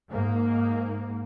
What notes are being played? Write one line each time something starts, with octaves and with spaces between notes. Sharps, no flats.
G#2 A#3